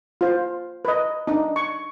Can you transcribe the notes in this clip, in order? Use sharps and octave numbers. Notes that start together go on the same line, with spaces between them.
F4 C5
B4 D#5
D4 D#4
C#6